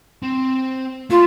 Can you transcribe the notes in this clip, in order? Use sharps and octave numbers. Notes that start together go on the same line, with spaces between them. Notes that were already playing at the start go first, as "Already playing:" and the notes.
C4
A3 F4